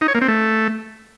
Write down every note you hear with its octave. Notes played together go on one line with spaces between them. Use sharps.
D#4
C#5
A#3
C4
A3